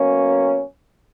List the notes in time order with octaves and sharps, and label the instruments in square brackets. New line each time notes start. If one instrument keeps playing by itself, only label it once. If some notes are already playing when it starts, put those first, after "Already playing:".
Already playing: [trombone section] B2 F#3 A#3 C#4